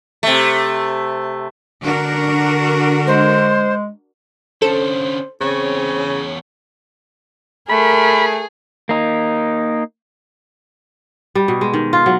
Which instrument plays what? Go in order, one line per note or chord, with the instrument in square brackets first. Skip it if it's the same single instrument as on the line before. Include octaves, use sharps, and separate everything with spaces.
[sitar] C3 A3
[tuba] D3 [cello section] D4 F#4 A#4
[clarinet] G#3 [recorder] C5
[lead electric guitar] D3 C#4 [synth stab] A4 [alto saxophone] C5
[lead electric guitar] E2 C#5 [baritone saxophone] C#3 [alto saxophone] C4
[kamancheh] A3 [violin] G#4 [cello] A#4 [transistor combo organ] B5
[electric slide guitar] A#3 D#4
[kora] G3
B2
G#3
D#3
F4
F#3